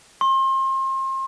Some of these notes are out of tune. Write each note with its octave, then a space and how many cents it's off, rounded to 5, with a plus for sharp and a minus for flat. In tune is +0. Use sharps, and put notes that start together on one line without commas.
C6 +35